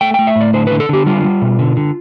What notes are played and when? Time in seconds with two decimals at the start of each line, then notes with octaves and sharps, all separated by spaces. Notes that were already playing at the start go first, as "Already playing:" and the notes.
0.01 A3 G5
0.14 A3 G5
0.27 E5
0.36 A2 D5
0.54 D3 C5
0.67 D3 B4
0.80 A4
0.89 D3 G4
1.06 G3 F4
1.24 G3
1.42 B2
1.59 D3
1.77 D3